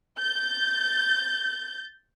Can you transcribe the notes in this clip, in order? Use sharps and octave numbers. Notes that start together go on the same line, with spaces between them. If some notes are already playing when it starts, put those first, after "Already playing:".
G6 A6